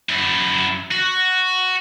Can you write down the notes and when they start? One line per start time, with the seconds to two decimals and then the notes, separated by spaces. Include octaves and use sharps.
0.09 F#2 E4
0.91 F#4